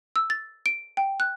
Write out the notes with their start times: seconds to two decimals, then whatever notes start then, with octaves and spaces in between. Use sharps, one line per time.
0.16 E6
0.30 A6
0.66 D7
0.97 G5
1.20 F#6